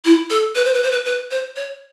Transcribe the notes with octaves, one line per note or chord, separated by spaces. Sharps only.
E4
A4
B4
C5
B4
C5
B4
B4
C5
C#5